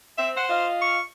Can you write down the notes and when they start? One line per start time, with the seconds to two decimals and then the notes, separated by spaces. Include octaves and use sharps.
0.18 C4 E5
0.37 C5 F#5
0.49 F4 D#5 F5
0.82 C#6